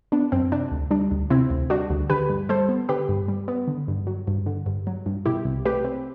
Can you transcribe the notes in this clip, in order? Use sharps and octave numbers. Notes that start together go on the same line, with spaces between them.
B3 D4
F#2 C4
C3 D4
D2
G3 D4
D2
C3 C4 E4
D2
G3 D4 F#4
D2
D3 G4 B4
G2
G3 A4 C5
B3
D3 G4 B4
G2
G3
B3
D3
G2
F#3
G2
D3
G2
F#3
G2
B2 E4 G4
C2
A3 G4 B4
C4